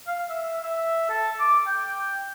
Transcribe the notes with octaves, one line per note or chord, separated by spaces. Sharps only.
F5
E5
E5
A4
D6
G5